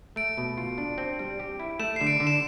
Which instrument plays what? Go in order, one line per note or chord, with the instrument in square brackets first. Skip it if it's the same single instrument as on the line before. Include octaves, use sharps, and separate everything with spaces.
[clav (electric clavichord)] A3 [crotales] D7
[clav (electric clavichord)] B2
F4
D4
C4
G3
G4
E4
[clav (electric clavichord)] A3 [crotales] E7
[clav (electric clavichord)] D3 [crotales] C7
[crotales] D7
[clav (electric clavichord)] D3
[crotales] E7